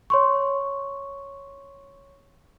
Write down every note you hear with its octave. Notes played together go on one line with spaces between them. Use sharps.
C#5 C6 C#6